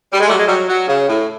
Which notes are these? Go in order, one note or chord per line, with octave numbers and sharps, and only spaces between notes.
G3
G#3
F#3 G3 A3
G#3
F#3 G3
F#3
C#3
A2